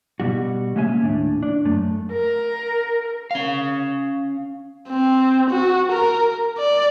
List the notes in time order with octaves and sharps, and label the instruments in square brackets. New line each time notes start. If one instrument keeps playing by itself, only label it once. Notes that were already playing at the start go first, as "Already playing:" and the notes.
[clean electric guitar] B2 G3 F#4
G#3 A#3 C#4 E5 G#5
D#2 A2 D4
D4
F#2 A3
[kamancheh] A#4
[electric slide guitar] C#4 F5
[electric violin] C4
F#4
A#4
D5